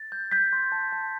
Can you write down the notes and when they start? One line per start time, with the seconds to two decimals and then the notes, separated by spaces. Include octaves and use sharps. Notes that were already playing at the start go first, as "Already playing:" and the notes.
Already playing: A6
0.12 G6
0.31 G6 B6
0.53 C6
0.72 A5
0.92 A5